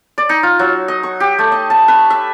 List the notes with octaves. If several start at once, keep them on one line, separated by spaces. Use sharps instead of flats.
D5
D#4
F4
F#3
D#5
C#6
G4
A3
D#5
A5
B4
E5